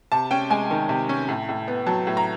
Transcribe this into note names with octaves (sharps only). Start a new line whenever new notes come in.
C3 A5
C#4 G5
G#3 G#5
D#3
C3
C#4
A2
A2
B3
F#3 A5
A2
A#5